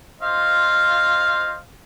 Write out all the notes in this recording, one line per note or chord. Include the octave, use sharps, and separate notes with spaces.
F4 C5 D#5 F5